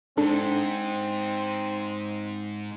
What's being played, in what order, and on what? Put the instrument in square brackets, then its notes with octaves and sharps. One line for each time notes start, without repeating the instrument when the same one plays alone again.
[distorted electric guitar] G#2 [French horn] C4 [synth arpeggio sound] D4 A4